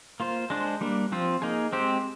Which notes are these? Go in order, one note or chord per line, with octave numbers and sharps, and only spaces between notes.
A#3 F4 C5
G#3 D4 G#4 C5
G3 A#3 D4
F3 C4 F4
A#3 D#4 G#4
G#3 C4 G4 C5